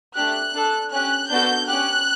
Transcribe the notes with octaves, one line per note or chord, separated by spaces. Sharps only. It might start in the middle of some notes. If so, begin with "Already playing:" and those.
A3 D4 G4 F#6
D4 A4
C#4 G4 F#6
B3 D4 F#4 A4 G6
C#4 G4 F#6